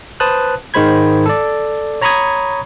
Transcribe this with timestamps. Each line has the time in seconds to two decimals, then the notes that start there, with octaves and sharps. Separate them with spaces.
0.20 B4 C5 A5 D#6 F#6
0.74 G#2 D#3 G#3 C5 B5 G#6
1.26 A4 D5
2.01 C#5 A#5 B5 C#6 D#6 G#6